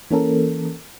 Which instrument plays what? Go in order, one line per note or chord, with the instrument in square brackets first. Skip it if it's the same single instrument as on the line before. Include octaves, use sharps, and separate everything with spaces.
[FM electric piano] E3 A#3 C#4 A4 A#4